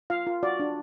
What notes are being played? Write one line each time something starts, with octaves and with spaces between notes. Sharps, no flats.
F4 F5
F4
F#4 D5
D4